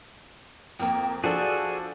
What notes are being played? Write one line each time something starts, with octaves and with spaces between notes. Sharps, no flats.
F2 A#3 G5
F3 D4 F#4 G#4 A4 D5